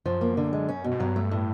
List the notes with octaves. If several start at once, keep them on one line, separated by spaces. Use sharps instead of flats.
F#2 F3
A#3
D3
G#3
C#4
B2
G#2
G2 F#3
A3
A2